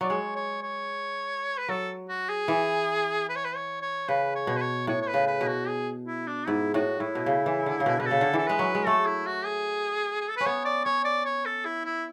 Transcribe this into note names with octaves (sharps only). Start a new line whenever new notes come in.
F#3 D5
G#3 C#5
C#5
C#5
B4
F#3 A4
F#4
G#4
E3
B4
C#5
B4
C#5
C#5
C#3 B4
C#5
B2
B4
C#5
A2 C#5
C#5
B4
C#3
B4
B2
F#4
G#4
E4
D4
G#2 E4
A2 F#4
A2 E4
B2
C#3
E3
D3
C#3
B2
B2 B4
C#3 A4
D3
E3 A4
G#3 B4
F#3
G#3
A3 A4
E4
F#4
G#4
G#4
A4
B4
C#4
B3 C#5
D5
C#4 C#5
D5
C#5
A4
E4
E4